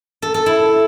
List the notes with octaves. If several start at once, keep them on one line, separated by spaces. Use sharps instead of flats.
A4
A4
E4